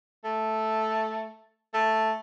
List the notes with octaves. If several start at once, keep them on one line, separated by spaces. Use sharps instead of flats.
A3
A3